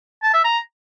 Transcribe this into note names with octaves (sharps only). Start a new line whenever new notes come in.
A5
E5
A#5